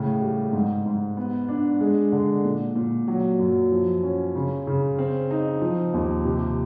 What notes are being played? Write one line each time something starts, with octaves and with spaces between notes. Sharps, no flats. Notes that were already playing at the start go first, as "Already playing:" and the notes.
Already playing: A2 C#3
G3
G#2
G#2
B3
D4
G#3
D3
A#2
A#2
F#3
F#2
F3
C#4
C#3
C#3
C4
D#4
F3
D#2
C3